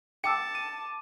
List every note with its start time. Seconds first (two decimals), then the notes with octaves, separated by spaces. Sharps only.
0.24 G5 A5 D6 E6 C#7
0.55 D#7